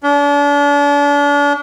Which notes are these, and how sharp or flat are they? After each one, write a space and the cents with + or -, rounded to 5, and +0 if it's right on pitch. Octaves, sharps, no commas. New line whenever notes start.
D4 -35